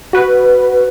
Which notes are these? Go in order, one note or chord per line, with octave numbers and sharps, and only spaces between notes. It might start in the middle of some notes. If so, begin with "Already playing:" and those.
F#4 B4